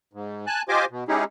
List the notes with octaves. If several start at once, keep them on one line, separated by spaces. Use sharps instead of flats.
G#2
G#5 A5 F#6
F4 G4 C5 D#5 G#5 D6
B2
G#3 C#4 D#4 E4 G4 G#4